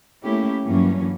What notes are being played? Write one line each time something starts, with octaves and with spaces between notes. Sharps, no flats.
A3 A#3 C#4 E4 G4
G2 E3 F#3 A#3 C#4